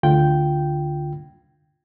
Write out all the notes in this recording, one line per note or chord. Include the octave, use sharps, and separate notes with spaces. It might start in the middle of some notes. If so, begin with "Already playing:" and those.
D2 D3 F4 G5 G6